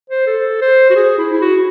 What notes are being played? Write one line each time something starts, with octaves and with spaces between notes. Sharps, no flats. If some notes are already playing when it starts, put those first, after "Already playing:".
C5
A4
C5
F#4
G#4
E4
E4
F#4